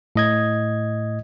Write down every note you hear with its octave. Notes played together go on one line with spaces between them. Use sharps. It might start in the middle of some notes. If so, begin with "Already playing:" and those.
A2 D#5 G#6